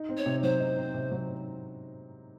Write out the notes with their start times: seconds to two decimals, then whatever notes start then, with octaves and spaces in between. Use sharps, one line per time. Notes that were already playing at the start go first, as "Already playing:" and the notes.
Already playing: D#4
0.09 C4
0.17 C#5
0.26 C3
0.43 F#3 C5
0.60 D#4
0.78 C4
0.94 C3
1.11 F#3